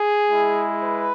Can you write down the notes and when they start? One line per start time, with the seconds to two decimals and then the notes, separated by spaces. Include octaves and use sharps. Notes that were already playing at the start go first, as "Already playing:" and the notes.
Already playing: G#4
0.30 G#3 E4
0.83 B4